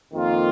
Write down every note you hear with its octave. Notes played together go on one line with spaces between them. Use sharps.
F2 D#3 A#3 F4